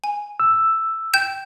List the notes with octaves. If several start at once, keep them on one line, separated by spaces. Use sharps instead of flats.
G#5
E6
G5 G6 E7